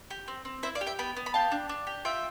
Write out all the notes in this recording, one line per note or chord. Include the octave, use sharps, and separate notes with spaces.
G4
C4
C4
E4 C5 E5
D5 F5
G4
E5 G5
B3 G5 B5
B3
B5
G4 F5 A5
D4
D4
G4
F4 E5 G5